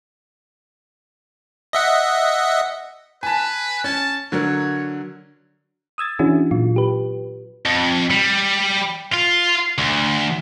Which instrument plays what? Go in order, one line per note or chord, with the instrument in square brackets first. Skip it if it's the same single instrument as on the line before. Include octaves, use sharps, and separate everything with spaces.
[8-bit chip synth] D#5 E5 F#5
[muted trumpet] B4 [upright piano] G#5 A5
[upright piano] C#4 [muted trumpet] A5
[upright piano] D3 F#3 A#4 [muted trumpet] C#5
[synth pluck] D#6 E6 G#6 A6
E3 C#4 D4 E4 F#4 G#4
A#2 F#3 F4
G4 B4
[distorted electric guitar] F2
G3
F4
D2